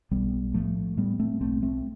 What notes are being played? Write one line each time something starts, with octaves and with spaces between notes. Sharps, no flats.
B1 G3 B3
A2 F3 A3
A2 G3 B3
A3 C4
B1 A3 C4
A3 C4